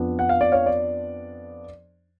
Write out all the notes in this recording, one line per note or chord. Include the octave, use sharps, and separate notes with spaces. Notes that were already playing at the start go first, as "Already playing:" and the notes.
Already playing: F2 F3 B3 D4
F#5
F5
D5
C#5 F5
D5